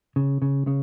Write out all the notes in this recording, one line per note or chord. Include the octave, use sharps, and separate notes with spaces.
C#3
C#3
C#3